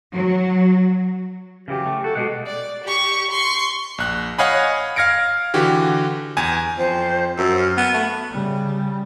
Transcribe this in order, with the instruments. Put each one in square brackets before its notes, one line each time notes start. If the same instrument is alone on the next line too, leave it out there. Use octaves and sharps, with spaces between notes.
[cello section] F#3
[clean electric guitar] C#3 E3 F#3 [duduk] G4
[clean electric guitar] A3
[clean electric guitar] F#4 [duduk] A4
[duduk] B2 [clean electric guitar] G#3 G4 F#5
[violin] D5
G4 C#6
C6 C#6
[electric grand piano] A#1 F#6
C#5 D#5 F5 F#5 G#5 B5
F5 F6 G#6 A#6 C#7 D7
D3 E3 F#4 G4
E2 G#5
[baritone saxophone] F2 [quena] C5
[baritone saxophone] F#2 [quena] E6
[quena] F6
[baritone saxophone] B3 [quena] F#6
[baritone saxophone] A3 [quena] B5
[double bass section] C#3 [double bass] G3